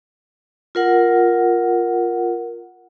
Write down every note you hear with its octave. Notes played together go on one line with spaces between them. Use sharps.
F4 A#4 F#5